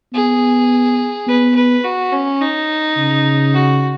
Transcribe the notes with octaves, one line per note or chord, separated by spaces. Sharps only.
B3 G#4
B3 B4
B4
F#4
C#4
D#4
C#3
F#4